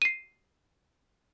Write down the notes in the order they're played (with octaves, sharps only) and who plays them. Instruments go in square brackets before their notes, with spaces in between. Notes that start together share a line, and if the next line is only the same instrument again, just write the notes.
[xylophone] C7 D#7